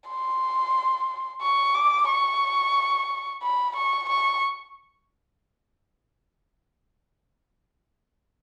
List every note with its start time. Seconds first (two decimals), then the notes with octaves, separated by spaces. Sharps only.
0.09 C6
1.41 C#6
1.75 D6
2.09 C#6
3.42 B5
3.76 C#6
4.09 C#6